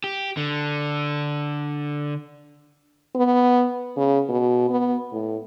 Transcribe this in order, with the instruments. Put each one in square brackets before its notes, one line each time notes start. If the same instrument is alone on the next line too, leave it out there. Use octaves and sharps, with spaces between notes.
[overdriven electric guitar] G4
D3
[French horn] B3
C#3
B2
B3
A2